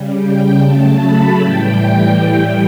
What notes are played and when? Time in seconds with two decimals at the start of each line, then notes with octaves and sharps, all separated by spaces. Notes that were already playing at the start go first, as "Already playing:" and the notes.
Already playing: C#3 G3
0.16 G5
0.58 C#3 F#3 A3 A5
0.99 B5
1.40 A2 E3 G3 G5